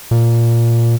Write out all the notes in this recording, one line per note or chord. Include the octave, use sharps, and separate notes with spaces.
A#2